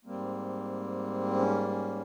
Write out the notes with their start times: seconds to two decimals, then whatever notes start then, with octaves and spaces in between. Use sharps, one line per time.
0.05 G#2 G3 A#3 C4
1.36 C#4
1.69 C#4